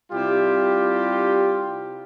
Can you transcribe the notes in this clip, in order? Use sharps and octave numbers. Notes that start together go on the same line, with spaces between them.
C3 G3 E4 F4 G4